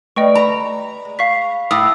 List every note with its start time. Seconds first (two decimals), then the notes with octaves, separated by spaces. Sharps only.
0.16 G3 A3 B4 D5 D#5 G5 C#6
0.35 A#5 B5
1.05 G#3
1.19 F5 C#6 B6
1.71 A2 C4 D6 D#6